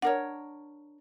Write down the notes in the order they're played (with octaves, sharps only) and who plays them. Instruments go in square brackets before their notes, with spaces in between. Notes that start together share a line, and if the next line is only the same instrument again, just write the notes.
[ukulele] D4 A#4 C#5 [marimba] F#5